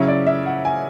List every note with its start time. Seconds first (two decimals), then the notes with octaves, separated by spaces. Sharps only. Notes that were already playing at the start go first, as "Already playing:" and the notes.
Already playing: C#3 F#3 C#4 E4 C#5
0.08 D5
0.27 E5
0.46 F#5
0.65 G#5